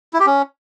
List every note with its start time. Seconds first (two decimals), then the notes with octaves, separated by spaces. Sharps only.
0.14 E4
0.20 G4
0.27 C#4